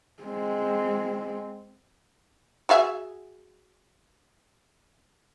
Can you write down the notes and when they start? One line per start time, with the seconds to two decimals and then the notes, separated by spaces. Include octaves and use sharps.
0.23 G#3 C4
2.69 F#4 G#4 E5